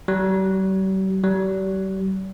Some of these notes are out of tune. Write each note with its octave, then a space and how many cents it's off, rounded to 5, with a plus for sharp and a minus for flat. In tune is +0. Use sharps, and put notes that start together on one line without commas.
G3 -45
G3 -40